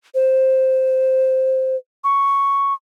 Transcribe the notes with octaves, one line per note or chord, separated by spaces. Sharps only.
C5
C#6